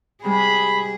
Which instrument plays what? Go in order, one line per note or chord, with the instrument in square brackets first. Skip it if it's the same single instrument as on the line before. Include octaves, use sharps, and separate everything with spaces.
[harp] C3 G3 G#3 [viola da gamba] G#4 [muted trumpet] B5